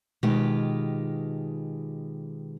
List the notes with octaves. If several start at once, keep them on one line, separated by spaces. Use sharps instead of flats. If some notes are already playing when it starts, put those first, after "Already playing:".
B2 D#3 G#3 F4 G4